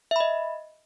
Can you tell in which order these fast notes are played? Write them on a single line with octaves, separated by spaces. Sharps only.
E5 B5 D#5